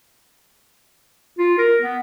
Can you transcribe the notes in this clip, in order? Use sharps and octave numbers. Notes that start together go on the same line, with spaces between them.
F4
A#4
B3